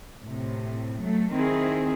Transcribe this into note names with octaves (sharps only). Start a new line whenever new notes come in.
A2 C3
F#3 A3
D#3 C4 E4 G#4